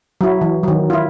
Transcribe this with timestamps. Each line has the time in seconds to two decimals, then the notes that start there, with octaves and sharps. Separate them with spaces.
0.21 F#3 E4
0.41 E3
0.63 D#3 F#3
0.90 E4 F4